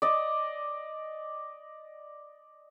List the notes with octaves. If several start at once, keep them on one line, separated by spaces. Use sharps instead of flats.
D5 D#5